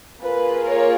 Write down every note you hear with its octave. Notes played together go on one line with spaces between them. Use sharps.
A#3 F4 G#4 B4
A#4 C#5